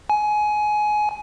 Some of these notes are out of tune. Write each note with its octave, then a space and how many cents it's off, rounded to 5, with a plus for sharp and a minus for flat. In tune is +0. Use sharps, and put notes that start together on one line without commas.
G#5 +20